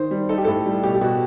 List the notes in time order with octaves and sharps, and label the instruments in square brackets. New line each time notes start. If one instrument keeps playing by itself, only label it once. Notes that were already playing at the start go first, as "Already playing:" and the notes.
Already playing: [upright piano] D#3 [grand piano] C5
[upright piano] G3
[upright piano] D#4 [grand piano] A4
[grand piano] G4
[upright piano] A2 [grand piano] A4
[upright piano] G3
[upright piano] B2 [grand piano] G4
[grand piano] G4
[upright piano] B2 [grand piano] F#4